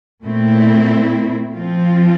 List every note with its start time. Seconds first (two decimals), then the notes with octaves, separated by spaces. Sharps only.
0.23 A#2 A3 C4 E4
1.55 F3 C4 F4